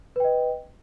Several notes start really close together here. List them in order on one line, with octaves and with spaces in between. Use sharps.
B4 G5 D#5